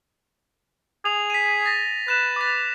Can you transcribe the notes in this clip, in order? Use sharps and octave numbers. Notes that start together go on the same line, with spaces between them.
G#4 F7
B6 D#7
A6 A#6
B4 F#6 E7
D6 A6